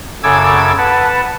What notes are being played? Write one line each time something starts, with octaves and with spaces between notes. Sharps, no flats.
F#2 C#3 A4 D6 E6 G#6
B4 F#5 A5